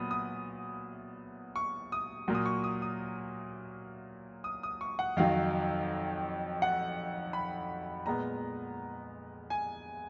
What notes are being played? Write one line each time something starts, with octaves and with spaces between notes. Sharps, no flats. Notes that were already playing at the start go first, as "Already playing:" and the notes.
Already playing: A#2 F#3 B3 B5 D#6
D#6
C#6
D#6
A#2 F#3 A#3
D#6
C#6
D#6
D#6
D#6
D#6
C#6
F#5
F2 D#3 F#3 F5
F#5
B5
A#2 G#3 B3 A#5
G#5